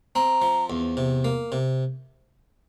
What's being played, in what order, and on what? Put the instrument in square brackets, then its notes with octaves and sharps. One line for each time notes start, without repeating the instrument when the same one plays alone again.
[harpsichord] C4 [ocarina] A#5
[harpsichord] F3
E2
C3
A#3
C3